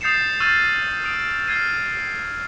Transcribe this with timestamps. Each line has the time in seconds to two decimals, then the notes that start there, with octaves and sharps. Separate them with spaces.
0.01 D#6 G6 A6 C7 C#7 E7
0.40 C#6 E6 F6 G6 A6 D#7
1.04 D#6 D7
1.47 F6 G#6 C7 D#7